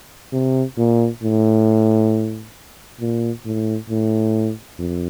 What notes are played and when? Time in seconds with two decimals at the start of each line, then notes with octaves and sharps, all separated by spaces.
0.32 C3
0.77 A#2
1.22 A2
3.00 A#2
3.45 A2
3.90 A2
4.79 F2